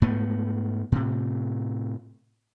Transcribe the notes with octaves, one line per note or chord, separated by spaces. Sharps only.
G#2 A3 B3
A2 C3